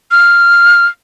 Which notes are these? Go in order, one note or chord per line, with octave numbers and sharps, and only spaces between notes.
F6